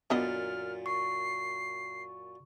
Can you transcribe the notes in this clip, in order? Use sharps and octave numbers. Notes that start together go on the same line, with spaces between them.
F#2 A#2 D3 B3 D#5 F6
C#6 C7